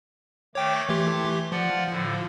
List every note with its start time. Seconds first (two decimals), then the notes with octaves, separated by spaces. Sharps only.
0.55 D#3 A3 C#5 G5 D6
0.89 E3 A3 G4 C6 D6 G#6
1.52 F3 F4 D5 F#5
1.90 A2 D3